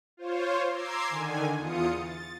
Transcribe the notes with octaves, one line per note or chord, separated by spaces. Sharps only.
F4 C5 C#5
A#5 C6 D6 E6 G#6 C7
D3 D#3 G#5
E2 F4 D#6 C#7
A6